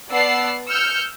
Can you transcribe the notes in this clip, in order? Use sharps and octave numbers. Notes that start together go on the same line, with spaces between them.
B3 D5 F#5 A5 E6 C7
E6 F6 G6 C#7